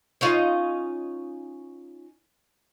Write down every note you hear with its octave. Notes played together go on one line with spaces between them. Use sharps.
C#4 D#4 F4